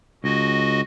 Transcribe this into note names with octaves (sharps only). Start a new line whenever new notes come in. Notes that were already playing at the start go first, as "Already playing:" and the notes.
C#2 F#4 D#5